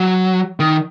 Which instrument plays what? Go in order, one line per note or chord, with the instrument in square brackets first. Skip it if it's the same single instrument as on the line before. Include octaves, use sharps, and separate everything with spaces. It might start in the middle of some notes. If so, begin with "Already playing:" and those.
Already playing: [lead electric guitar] F#3
D#3